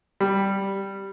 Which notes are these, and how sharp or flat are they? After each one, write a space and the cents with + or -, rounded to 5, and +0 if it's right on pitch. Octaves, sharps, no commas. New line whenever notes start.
G3 -5